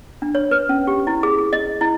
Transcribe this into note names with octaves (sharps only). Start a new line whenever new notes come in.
D4
C#5
B4
C#4
G4
E4
G#4
G#4
D#5
E4